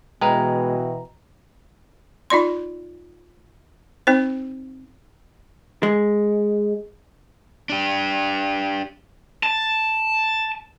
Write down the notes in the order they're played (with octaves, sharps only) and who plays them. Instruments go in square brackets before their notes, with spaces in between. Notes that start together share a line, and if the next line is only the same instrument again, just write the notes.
[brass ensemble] B2 E3 [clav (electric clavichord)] G#3 B4 F5 [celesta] G5 [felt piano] A#5
[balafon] D#4 F4 D5 C6
C4 D#4 C5
[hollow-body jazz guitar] G#3
[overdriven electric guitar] D4 G4
[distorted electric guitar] A5